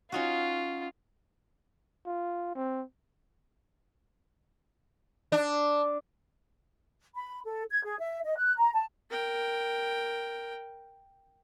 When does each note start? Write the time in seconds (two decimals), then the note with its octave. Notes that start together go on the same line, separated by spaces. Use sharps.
0.12 C#4 D#4 F4 F#4
2.06 F4
2.55 C4
5.32 D4
7.14 B5
7.44 A4
7.69 G#6
7.83 G#4
7.98 E5
8.23 D#5
8.37 F#6
8.56 A#5
8.73 A5
9.10 A#4 G5